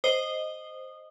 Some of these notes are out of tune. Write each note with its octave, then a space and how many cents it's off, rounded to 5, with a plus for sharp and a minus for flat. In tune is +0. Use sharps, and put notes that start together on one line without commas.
C5 +0 D#5 +0 D#6 -20